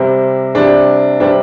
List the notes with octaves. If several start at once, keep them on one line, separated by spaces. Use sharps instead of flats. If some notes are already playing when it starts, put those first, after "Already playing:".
Already playing: C3 G3 C4
C3 G3 C4 D4
C3 G3 C4 D4